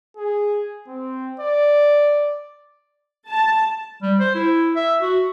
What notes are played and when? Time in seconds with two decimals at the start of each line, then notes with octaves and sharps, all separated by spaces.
0.17 G#4
0.88 C4
1.40 D5
3.29 A5
4.02 G3
4.20 C5
4.35 E4
4.76 E5
5.01 F#4